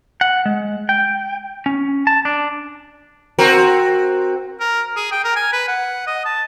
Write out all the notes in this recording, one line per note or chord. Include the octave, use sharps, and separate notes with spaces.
F#5
G#3
G5
C#4
A5
D4
C4 F#4 A#4
A#4
G#4
G5
A#4
G#5
B4
F#5
D#5
A5